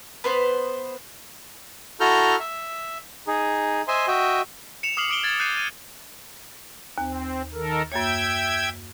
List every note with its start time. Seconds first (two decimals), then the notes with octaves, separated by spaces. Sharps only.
0.24 B3 B4 C5
2.00 E4 F#4 A4 A#5 F6 G6
2.40 E5
3.27 D#4 G#4
3.88 C5 D#5 E5 G#5 C6
4.07 F#4 D#5 E5 G5
4.83 C#7 E7 F7
4.97 D6 D#6 F6 C7 F#7
5.10 D6 D#6 C#7 D7 F#7 G7
5.24 G#6 A6
5.40 F#6 G6 C7 C#7 D#7 E7
5.56 A6 D#7
6.98 D#2 C4
7.54 D#3 A4 A#4
7.92 F#2 A#3 C#5 E5 G5 G#6